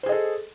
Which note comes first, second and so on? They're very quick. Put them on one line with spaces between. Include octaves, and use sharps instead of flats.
C5 G#4 D#5 A4